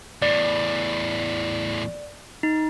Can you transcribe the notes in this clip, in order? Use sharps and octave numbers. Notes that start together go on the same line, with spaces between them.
E2 A2 D5
D#4